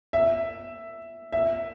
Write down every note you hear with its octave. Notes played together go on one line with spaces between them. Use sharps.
E5
E5